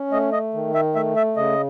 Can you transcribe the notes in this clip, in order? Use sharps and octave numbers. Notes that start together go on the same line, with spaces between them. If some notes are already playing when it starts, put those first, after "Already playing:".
Already playing: C#4
A3 D#5
D#5
D#3
E5
A3 E5
E5
C#3 D#5